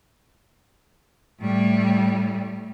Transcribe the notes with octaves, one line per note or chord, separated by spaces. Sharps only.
A2 G3